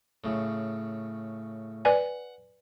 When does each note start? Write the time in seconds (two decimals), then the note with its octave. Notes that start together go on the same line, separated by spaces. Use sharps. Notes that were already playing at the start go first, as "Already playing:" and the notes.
0.24 A2 C#3
1.85 B4 D5 F#5 G#5